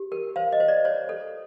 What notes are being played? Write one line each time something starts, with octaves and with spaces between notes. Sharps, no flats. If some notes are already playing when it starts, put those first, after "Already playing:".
Already playing: G4
A#4
C5 F5
D#5
C5
D5
C5 C#5
A4